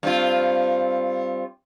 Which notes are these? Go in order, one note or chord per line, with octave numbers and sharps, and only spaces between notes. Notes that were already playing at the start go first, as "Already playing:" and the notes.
G2 C4 F4